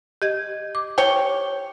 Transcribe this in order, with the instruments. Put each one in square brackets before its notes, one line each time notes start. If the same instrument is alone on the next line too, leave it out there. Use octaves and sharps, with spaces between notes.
[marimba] G4 D#5 G#6
D6
[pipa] C#5 G5